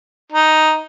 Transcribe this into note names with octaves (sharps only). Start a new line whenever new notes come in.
D#4